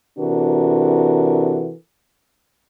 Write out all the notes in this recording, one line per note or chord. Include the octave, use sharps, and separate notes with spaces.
C3 E3 D4 F#4 A4 A#4